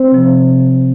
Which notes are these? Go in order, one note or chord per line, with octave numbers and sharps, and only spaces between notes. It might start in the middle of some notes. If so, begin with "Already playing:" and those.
Already playing: C4 C5
C3 F3